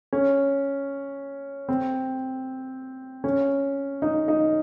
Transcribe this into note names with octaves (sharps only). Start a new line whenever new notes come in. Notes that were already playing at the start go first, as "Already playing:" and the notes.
C#4
C4
C#4
D#4
D#4